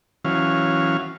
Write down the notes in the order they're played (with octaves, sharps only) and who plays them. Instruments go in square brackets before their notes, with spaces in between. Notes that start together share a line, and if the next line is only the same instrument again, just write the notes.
[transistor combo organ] E3 F#3 C#4 F5